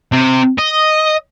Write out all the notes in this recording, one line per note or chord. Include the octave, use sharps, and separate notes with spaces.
C3
D#5